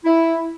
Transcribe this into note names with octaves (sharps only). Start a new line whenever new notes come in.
E4